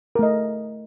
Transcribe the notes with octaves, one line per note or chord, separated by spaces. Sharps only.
A3 A#4 D#5